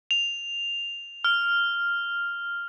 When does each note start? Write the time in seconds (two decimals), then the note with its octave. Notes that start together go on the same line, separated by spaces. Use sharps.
0.11 F7
1.24 F6